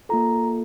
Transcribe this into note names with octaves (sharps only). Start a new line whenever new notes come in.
A#3 F4 A4 A#5